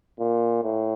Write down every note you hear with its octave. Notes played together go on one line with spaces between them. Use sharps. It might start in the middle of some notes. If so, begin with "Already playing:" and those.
A#2
A2